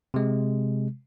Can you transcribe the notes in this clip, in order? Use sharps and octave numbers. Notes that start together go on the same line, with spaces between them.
C3 G#3